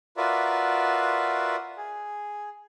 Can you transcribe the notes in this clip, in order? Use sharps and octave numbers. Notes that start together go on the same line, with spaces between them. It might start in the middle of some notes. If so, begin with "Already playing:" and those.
F4 F#4 A#4 B4 D5 E5
G#4